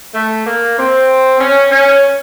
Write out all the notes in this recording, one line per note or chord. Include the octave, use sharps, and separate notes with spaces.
A3
A#3
C4
C#4
C#4